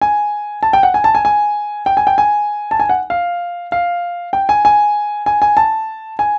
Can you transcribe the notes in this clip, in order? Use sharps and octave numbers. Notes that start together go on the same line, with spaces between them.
G#5
A5
G5
F#5
G#5
A5
G#5
G#5
G5
G#5
G5
G#5
A5
G#5
F#5
F5
F5
G5
G#5
G#5
G#5
G#5
A5
G#5